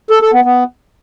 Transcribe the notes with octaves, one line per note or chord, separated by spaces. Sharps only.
A4
A4
B3
B3